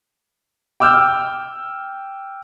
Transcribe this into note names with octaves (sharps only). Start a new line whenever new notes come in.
G5 D6 E6 F6 G6